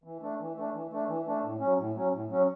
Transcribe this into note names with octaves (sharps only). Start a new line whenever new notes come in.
E3
A3 D4
E3
A3 D4
E3
A3 D4
E3
A3 D4
A2
F#3 C#4
A2
F#3 C#4
A2
F#3 C#4